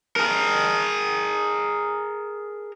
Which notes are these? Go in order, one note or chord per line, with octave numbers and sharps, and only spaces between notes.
G#4 A#4